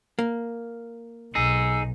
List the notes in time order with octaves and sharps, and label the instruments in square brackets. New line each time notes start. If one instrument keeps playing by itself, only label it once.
[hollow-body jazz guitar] A#3
[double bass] B1 [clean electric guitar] D#4 G#4 [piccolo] E6